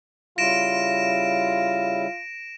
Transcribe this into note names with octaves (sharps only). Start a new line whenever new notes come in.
C#3 G3 E4 F4 A#6 D7 E7